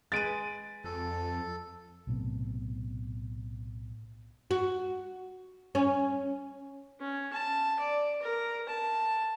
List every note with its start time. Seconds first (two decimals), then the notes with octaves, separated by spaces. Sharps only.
0.12 G#3 B4 A6 D7 D#7
0.84 F2 A4
2.07 B1 A2 C3 B3
4.51 F#4
5.75 C#4
7.00 C#4
7.32 A5
7.79 D5
8.21 A#4
8.68 A5